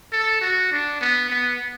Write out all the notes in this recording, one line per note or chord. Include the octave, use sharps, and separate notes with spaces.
A4
F#4
D4
B3
B3